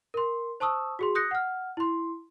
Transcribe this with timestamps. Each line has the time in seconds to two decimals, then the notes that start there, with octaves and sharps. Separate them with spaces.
0.14 A#4 C6
0.60 C5 A5 C#6 D#6 E6
0.99 F#4 G#4 C6
1.15 D#6 F#6 G6 A#6 C#7
1.31 F#5 F6
1.77 E4 C6